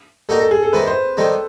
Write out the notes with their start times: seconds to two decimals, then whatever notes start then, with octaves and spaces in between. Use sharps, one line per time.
0.29 G3 A#3 D#4 F#4 A4 A#4
0.40 A4
0.51 G#4
0.63 A4
0.73 C3 D#3 G3 A#3 B4
0.87 C5
1.17 C3 D#3 G3 A#3 A4